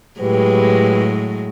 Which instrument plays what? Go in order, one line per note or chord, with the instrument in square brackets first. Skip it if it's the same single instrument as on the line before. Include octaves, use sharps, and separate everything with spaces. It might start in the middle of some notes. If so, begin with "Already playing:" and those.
[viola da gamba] A2 F#3 G#3 [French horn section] G4 B4